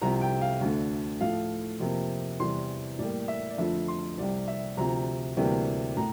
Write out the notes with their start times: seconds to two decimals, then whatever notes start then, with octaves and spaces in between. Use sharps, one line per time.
0.02 C2 C3 F3 A#5
0.22 G5
0.42 F5
0.61 D2 D3 A3
1.20 A2 F3 A3 F5
1.80 F2 C3 F3 A#3
2.40 E2 C3 E3 G3 C6
2.99 A2 G3 A#3 D5
3.28 E5
3.50 D5
3.58 F2 D3 F3 A3 E5
3.88 C6
4.18 C2 C3 G3 D5
4.48 E5
4.77 D2 C3 F3 A#5
5.37 D2 C3 E3 G3 A#3
5.97 A2 A#5